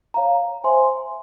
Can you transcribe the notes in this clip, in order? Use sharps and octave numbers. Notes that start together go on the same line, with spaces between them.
C#5 F5 A#5
C5 E5 G#5 C6